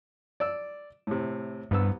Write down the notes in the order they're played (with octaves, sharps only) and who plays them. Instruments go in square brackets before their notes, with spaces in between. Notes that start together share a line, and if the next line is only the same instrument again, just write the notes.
[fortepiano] D5 E6
A2 C3
[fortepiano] C2 B3 E6 [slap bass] G2